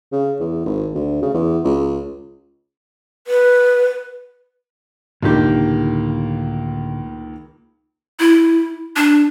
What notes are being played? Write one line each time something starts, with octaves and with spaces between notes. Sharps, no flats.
C#3
E2
G#1
D2
C#3
E2
C#2
B4
C#2 A2 D3 D#3 A#3 G4
E4
D4